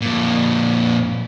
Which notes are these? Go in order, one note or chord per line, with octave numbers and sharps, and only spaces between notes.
F2 A#2